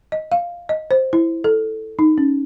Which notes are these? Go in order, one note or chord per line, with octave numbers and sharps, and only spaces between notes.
D#5
F5
D#5
C5
E4
A4
D#4
C#4